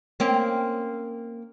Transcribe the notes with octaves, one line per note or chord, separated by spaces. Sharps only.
A#3 C4 C#4